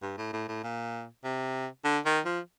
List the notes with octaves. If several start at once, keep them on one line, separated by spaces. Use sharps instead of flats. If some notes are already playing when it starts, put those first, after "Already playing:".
G2
A2
A2
A2
A#2
C3
D3
D#3
F3